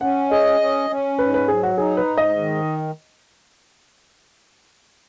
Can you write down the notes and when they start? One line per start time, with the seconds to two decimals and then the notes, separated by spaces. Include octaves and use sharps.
0.01 C#4 F#5
0.31 G#4 D#5
0.60 C#4
0.90 C#4
1.19 G#2 B4
1.34 B4
1.48 F#3 G#4
1.63 F#4
1.78 D#4 G#4
1.97 B4
2.08 G#2
2.17 D#5
2.37 D#3